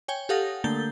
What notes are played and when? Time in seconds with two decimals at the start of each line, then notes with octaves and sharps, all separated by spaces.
0.08 C#5 G5 G#5
0.29 G4 A4 F5 F#5 D#6 A#6
0.64 D3 A3 A#3 G6 A6 G7